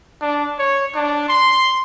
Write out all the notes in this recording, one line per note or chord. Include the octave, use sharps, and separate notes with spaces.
D4
C#5
D4
C6